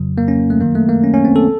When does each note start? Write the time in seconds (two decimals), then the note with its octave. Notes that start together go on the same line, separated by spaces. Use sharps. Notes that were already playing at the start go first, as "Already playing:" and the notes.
Already playing: F2 C#3 F#3
0.18 A#3
0.28 C#4
0.50 A3
0.60 F#2 D#3 F#3 A#3
0.75 A3
0.89 A#3
1.04 C#4
1.14 C#4
1.25 C4
1.36 A4